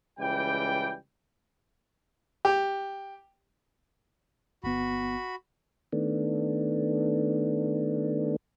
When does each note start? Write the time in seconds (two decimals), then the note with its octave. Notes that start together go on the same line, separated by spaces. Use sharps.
0.19 C#2 E3 G3 G5
2.45 G4
4.64 G1 B3 F#4 B5
5.93 D#3 A3 B3 D4